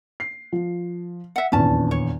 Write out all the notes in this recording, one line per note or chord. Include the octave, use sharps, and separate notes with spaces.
C7
F3
E5 F#5
D#1 A#1 E2 C#4 A5
C#5